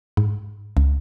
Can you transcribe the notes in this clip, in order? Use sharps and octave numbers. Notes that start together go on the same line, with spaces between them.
G#2
C#2